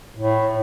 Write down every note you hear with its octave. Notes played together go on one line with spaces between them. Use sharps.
A2